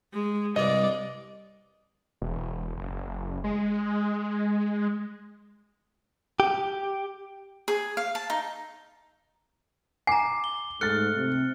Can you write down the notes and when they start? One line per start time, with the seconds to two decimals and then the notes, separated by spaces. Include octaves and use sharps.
0.13 G#3
0.56 C2 G2 D5 D#5
2.22 E1
2.77 F#1
3.44 G#3
6.40 G4
7.68 G#4
7.97 F5
8.15 A5
8.30 D#4
10.07 G#5 A#5 D6 C7
10.44 G7
10.81 G#2 A3 F6 F#6 A6 C#7
11.17 C3